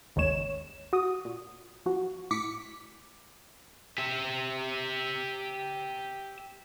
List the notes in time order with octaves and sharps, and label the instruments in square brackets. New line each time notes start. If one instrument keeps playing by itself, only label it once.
[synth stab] G#1 D#2 C#3 G#3 C#5 E7
F#4 D#6
A#2
F3 F#4
A2 D6 B6 C#7
[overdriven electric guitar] G4 E5